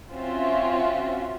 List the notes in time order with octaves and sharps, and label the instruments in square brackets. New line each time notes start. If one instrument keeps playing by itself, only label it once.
[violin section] C4 C#4 F4 F#4 E5